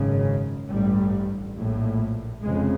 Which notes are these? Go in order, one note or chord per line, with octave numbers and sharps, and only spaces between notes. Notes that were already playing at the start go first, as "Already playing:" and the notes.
Already playing: G#1 F#2 C#3
A1 G2 G3
A#1 A2
F1 F2 C#3 G#3